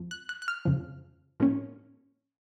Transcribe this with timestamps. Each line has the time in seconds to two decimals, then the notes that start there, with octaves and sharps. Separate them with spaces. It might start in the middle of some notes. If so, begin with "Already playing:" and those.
Already playing: F2 F3
0.11 F#6
0.29 F#6
0.42 F#6
0.48 F6
0.65 F2 C#3 F3
1.40 A2 F3 A#3 C#4